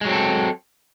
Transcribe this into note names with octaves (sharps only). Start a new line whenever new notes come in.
F#3 G#3 C4 A4